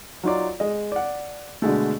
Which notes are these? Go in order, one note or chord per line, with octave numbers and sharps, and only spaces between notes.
F#3 D#4 F4 D5
G#3 D#5
D5 F#5
B2 D3 G#3 A3